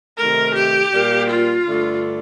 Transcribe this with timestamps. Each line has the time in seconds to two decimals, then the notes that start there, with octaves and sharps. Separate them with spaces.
0.17 C3 D#3 A3 A#4
0.55 G4
0.92 A#2 G3 A#3
1.30 F4
1.66 G2 D3 A3